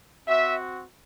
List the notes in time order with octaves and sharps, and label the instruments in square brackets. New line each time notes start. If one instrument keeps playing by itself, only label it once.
[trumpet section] C4 F#4 E5